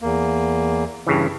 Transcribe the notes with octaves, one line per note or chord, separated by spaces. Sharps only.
E2 A#3
G2 C#3 E3